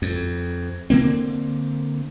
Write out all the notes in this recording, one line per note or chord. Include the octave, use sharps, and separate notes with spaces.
F2
D3 D#3 A#3 C4